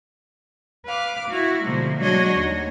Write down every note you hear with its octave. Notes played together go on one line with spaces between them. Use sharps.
B4 F5 D6
E4 F#4
B2 D3 F3 G#3 A#3
F#3 G#3 D4 F#4 C#5 D#5
D#2